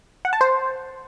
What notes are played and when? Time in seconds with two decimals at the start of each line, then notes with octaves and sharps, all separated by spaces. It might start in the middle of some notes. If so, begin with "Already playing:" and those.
0.25 F#5
0.33 A5
0.41 C5